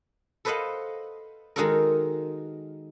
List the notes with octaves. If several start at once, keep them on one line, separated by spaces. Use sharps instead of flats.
A4 B4 C5 D#5 F5 F#5
D#3 G#3 D#4 F#4 A4 A#4